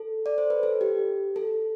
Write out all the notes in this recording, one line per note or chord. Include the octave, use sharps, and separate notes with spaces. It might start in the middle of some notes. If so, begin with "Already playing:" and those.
Already playing: A4
D5
C5
B4
A4
G4
A4